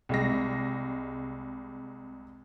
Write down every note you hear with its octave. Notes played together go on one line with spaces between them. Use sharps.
C2 G#3 A#6